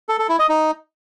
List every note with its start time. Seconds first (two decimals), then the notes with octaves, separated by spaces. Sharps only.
0.09 A4
0.19 A4
0.29 E4
0.39 D#5
0.49 D#4